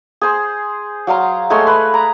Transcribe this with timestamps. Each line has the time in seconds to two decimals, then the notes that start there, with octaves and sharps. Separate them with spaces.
0.21 G#4 C5
1.07 F#3 F5 A#5 C6
1.50 G#3 A3 C#5 C6
1.67 B4
1.94 A#5